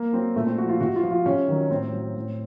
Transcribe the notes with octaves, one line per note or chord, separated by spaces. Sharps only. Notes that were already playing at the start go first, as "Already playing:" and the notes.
Already playing: A#3
F#3 C4
A#2 A3
C4
F3 F#4
F4
C3 F#4
F4
F3
F4
C3 C#4
D#3 F#3
A2 C4
F#3
A2